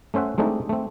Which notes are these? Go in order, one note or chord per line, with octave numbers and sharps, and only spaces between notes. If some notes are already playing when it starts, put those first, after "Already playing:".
A3 C#4 C5 E5 F#5
G#3 A3 C4 D4 D#4 G4
A3 C4